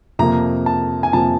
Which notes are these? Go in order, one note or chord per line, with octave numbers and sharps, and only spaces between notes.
F2 C3 F3 A#3 A#5
A5
G#5
F2 C3 F3 A#3 A5